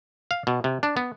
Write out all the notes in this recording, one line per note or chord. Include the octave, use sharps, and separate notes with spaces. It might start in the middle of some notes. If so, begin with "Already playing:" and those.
F5
B2
C3
D4
B3